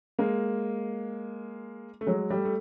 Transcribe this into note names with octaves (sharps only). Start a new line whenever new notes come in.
G#3 A#3
A3
F#3 G#3
G3 A3
A3